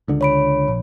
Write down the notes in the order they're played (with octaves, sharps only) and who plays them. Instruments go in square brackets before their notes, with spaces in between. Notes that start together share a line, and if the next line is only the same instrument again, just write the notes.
[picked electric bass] C#2 D3
[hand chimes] C#5 B5 D7
[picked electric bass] A#1